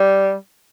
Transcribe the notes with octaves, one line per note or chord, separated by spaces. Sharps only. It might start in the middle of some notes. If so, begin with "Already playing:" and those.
Already playing: G3